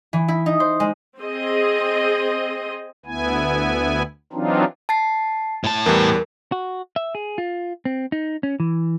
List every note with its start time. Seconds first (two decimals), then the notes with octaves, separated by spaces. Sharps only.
0.13 E3
0.28 E4
0.46 D#4
0.60 C5
0.80 G#3
1.19 C4 G#4 D#5
3.06 D2 B3 E4 G#5
4.33 E3 F#3 C4 D4 D#4 F4
4.89 A5 A6 C7
5.64 A2 A5
5.86 E2 E3 G3 A#4
6.52 F#4
6.96 E5
7.15 G#4
7.38 F4
7.85 C4
8.12 D#4
8.43 C#4
8.60 E3